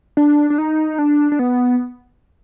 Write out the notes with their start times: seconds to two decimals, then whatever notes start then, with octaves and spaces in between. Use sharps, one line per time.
0.17 D4
0.50 D4
0.58 D#4
0.99 D4
1.32 D4
1.39 B3